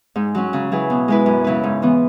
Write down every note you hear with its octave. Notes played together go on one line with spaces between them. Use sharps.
G#2
F#3 C#4
C#3
F#3 E4 G#4 B4
B2
G#3 E4 B4
F#2
C#3 F#3 E4 B4
G#2
E3 B3